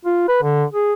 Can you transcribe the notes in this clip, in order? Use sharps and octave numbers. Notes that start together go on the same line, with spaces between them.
F4
B4
D3
G#4